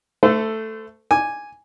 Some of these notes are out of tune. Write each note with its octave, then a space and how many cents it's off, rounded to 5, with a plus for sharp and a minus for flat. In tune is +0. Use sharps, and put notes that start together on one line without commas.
A3 +5 A4 +0 C5 -35
G#5 -5 D6 +0